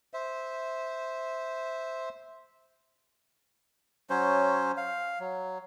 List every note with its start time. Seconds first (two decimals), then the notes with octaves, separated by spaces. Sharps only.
0.14 C5 E5
4.10 F#3 C#4 C5
4.77 F5
5.20 F#3